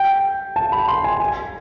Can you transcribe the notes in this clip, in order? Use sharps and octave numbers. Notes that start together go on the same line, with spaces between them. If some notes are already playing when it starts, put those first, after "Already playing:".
Already playing: G5
A5
B5
C6
G#5
G#5